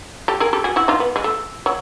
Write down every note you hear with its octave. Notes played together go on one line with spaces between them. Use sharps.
G4 A4
G#4 A#4
G4 A4
F#4 G#4
E4 F#4
D#4 F4
B3
G#3
A3
F#3